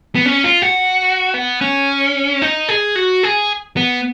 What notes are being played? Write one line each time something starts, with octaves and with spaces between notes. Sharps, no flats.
B3
C#4
F4
F#4
B3
C#4
D#4
G#4
F#4
G#4
B3